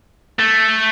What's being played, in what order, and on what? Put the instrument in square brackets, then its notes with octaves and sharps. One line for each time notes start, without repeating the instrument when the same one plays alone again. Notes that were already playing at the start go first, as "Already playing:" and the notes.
[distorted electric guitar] A3